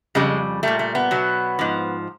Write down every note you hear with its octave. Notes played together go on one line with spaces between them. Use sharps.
F2 C#3 G3 G#3
A#2 G3 A3
A3
B3
B2 F#3
G#2 F3